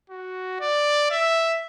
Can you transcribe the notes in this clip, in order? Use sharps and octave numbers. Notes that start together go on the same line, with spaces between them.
F#4
D5
E5